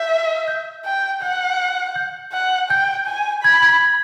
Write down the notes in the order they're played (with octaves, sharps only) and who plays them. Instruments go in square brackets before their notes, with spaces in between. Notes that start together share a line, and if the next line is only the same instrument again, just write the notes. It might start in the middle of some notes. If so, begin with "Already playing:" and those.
Already playing: [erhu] E5 [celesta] G6
[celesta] G6
[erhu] G5
[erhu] F#5 [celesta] G6
[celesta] G6
[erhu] F#5
[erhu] G5 [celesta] G6
[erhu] G#5
[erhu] B5 [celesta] G#6
[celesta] G#6